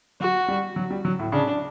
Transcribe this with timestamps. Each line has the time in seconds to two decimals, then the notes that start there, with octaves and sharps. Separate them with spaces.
0.20 F#3 F#4
0.48 G3
0.76 F#3
0.91 G3
1.05 F#3
1.19 A2
1.32 C#3 D4